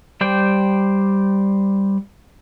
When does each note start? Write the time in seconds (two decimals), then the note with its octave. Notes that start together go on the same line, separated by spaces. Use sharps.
0.21 G3 C5 D5 G5